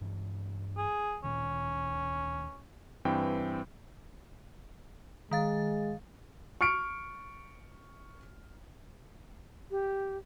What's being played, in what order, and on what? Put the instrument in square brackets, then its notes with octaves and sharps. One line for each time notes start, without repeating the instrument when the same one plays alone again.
[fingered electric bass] G2 E3 G#3
[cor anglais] G#4
[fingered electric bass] D2 A#2 D#3 [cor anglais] C#4
[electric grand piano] G2 E3 C4 G5
[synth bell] D#3 F5 A6 [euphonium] G#3
[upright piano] C#6 F6 C#7 D7
[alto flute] G4